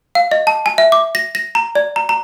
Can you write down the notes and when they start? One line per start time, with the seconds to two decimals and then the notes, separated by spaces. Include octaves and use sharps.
0.15 F5
0.31 D#5
0.47 A5
0.66 G#5
0.78 E5
0.92 D6
1.15 A#6
1.35 A#6
1.55 A#5
1.75 D5
1.96 A#5
2.09 A#5